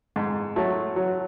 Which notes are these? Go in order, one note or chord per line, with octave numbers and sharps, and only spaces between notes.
G#2
F#3 A3
F#3